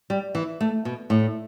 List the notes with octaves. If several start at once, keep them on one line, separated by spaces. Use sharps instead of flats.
G3
E3
A3
B2
A2